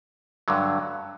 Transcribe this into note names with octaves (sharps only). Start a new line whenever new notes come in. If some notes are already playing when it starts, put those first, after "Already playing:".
G2 D3 F#3